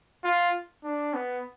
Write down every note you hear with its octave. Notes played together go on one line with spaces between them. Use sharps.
F4
D4
B3